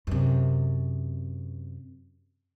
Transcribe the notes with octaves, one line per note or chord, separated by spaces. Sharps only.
F#2 C3